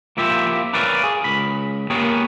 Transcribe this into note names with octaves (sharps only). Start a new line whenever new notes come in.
F3 A#3 E4 F4 G4 E5
A#4 B4 C#5 D5 F5 G#5
G#4
C#2 B5
A#3 B3 G4 G#4 A#4 C#5